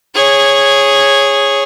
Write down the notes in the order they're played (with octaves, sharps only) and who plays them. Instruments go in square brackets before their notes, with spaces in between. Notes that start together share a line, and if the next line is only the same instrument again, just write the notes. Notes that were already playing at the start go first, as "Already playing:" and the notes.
[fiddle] G#4 C#5